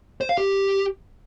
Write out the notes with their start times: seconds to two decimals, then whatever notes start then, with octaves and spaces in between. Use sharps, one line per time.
0.21 C5
0.29 F5
0.38 G4